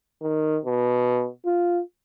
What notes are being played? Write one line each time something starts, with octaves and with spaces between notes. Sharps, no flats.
D#3
B2
F4